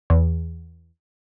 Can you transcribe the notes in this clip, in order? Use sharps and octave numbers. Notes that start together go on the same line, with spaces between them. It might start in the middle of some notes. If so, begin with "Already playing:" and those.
E2